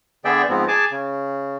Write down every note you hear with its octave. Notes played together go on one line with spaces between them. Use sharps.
D3 B3 G#4 D5 E5 G5
G#2 F3 B3 C4
G#4 G#5 A5 D6
C#3